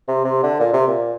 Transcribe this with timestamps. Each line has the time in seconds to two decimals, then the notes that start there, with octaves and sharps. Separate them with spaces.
0.08 C3
0.25 C3
0.43 D3
0.60 A#2
0.73 C3
0.87 A#2